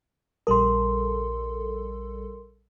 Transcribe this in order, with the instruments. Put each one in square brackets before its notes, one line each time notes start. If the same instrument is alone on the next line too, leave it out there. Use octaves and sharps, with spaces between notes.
[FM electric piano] A#1 G3 A4 [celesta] A#4 C6